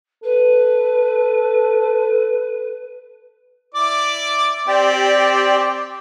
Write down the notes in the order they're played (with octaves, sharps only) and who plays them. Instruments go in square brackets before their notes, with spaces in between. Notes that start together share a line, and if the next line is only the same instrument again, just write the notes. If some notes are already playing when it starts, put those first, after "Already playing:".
[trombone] A4 [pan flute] B4
[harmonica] E4 D5 D6
[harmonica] C4 [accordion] G4 D5